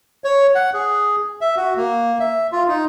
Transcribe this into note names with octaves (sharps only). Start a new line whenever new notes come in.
C#5
F#5
G#4
E5
F#4
A#3
E5
F4
D#4